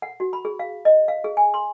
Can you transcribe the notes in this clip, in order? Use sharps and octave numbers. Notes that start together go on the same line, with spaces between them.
F#5
F#4
B5
G#4
F5
D#5
F5
G#4
G#5
C6